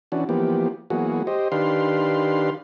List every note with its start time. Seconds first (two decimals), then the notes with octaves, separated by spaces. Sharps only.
0.12 E3 C#4 D4 F#4
0.29 E3 F3 A#3 B3 G4
0.90 E3 F#3 A#3 B3 F#4 G#4
1.27 G4 C5 D#5
1.52 D#3 D4 G4 B4 F5 C6